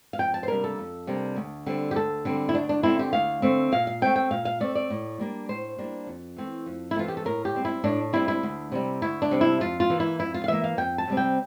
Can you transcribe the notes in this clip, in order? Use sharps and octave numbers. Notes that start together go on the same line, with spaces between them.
F5
F2 G5
A5
C5
C3 G3 A#3 D4 A#4
A4
F2
C3 G3 A#3 D4
D2
D3 G3 C4
G4
D2 A4
D3 G3 C4
E4
D2 D4
D4
D3 A3 C4 E4
G4
D2 F5
D3 A3 C4
A#2 F5
F5
A3 C4 G5
G5
A#2 F5
F5
A3 C4 D5
D5
A2
G3 A#3 D4
A2 C5
G3 A#3 D4
F2
E3 A3 C4
F2
E4
E3 A3 C4 F4
G4
A4
A2 A#4
G4
G3 C4
E4
A2 D4
G3 C4 E4
E4
D2
C3 G3
D2 E4
D4
C3 G3
E4
F2 F4
F4
E3 A#3
E4
F2 E4
F4
F5
E3 A#3 E5
F5
F2 G5
A5
C3 G3 C4
G5